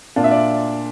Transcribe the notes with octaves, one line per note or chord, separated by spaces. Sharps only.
A#2 D4 F4
E5
D5